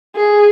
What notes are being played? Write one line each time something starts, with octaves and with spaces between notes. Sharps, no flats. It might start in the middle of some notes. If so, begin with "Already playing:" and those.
G#4